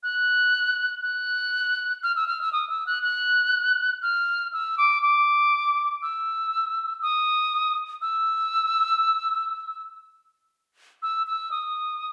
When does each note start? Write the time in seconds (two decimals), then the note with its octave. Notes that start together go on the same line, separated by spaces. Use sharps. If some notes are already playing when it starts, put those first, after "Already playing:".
0.03 F#6
1.03 F#6
2.03 F6
2.16 E6
2.28 F6
2.41 E6
2.53 D#6
2.70 E6
2.87 F#6
3.03 F#6
4.02 F6
4.53 E6
4.78 D6
5.03 D6
6.02 E6
7.02 D#6
8.02 E6
11.03 E6
11.27 E6
11.51 D#6